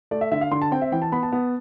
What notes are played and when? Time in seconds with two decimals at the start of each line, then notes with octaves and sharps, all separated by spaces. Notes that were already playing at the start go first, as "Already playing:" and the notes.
0.11 A3 D5
0.21 E5
0.32 D3 E5
0.41 F5
0.51 D3 C6
0.62 A5
0.72 C4 G5
0.82 E5
0.92 E3 G5
1.02 A5
1.12 B3 B5
1.23 A5
1.32 B3